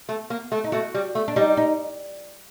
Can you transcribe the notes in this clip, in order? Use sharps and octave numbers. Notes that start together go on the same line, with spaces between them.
A3
A#3
A3
D#4
A3 F#4
G3
A3
D4
G3 D#4
D#4